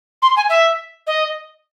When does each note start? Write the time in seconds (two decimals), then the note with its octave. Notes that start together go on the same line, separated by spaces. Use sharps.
0.22 C6
0.37 G#5
0.50 E5
1.07 D#5